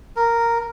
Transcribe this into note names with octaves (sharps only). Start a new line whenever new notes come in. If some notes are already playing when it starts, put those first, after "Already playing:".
A#4